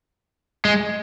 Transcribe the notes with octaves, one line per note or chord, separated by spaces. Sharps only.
G#3